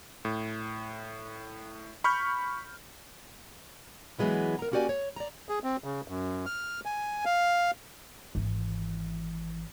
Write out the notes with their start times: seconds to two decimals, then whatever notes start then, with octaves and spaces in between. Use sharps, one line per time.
0.25 A2
2.04 B5 C#6 F6 G6
4.19 E3 F#3 G#3 B3 E4
4.59 A#4 A#5
4.72 A#3 C#4 F#4 G4 D5 G#5
4.89 C#5
5.16 D5 A#5
5.49 G#4
5.64 C4
5.84 C#3
6.08 F#2
6.46 F6
6.85 G#5
7.25 F5
8.35 G#1 E3